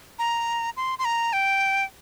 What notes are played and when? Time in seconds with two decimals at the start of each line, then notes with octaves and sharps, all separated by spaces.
0.19 A#5
0.77 C6
0.99 C6
1.05 A#5
1.33 G5